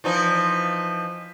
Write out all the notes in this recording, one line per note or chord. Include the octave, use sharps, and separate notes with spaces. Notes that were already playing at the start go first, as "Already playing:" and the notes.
E3 F3 D#4